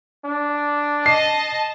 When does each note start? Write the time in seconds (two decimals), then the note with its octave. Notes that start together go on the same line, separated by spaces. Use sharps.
0.25 D4
1.06 D#5 A5 C7